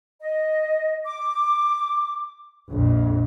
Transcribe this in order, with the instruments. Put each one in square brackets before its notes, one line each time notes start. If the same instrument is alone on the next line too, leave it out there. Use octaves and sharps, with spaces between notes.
[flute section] D#5
D6
[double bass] A#1 F2